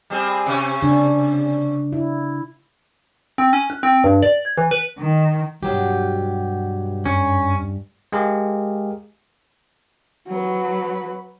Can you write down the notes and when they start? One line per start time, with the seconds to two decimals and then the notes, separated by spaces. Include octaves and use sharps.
0.10 G3 C4 G#4
0.46 C3 C#4 C#5
0.82 C#3 D4
1.92 E4
3.38 C4
3.53 C#4
3.70 F#6
3.83 C4
4.04 G2
4.23 D5
4.45 G#6
4.57 E3
4.71 B4
4.98 D#3
5.63 G2 B2 F#3 G4
7.06 F#2 C#4
8.12 G#3 G4 G#4 A#4 F5
10.27 F#3 B4